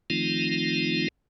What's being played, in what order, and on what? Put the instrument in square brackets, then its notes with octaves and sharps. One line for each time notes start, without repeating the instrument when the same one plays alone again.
[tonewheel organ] D#3 F3 A3 C4 D#4 F4